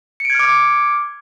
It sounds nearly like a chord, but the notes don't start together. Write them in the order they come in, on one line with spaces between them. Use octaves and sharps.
C#7 D7 G#6 F6 D6